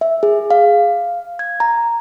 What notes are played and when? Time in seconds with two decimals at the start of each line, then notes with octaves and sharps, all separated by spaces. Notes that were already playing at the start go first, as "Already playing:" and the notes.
0.01 E5
0.23 G#4
0.50 F5
1.39 G#6
1.60 A#5